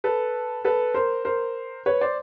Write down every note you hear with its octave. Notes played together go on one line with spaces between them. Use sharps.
A4 B4
A4 B4
A#4 C5
A#4 C5
B4 C#5
C5 D5